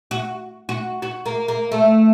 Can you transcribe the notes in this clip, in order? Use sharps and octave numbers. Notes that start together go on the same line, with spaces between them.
F#4
F#4
F#4
A#3
A#3
A3